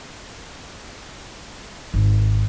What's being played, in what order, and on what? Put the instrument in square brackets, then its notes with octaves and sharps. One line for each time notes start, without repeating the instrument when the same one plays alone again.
[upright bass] G#1